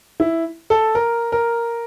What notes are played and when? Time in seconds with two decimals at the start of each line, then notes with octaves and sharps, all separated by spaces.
0.20 E4
0.70 A4
0.95 A#4
1.32 A#4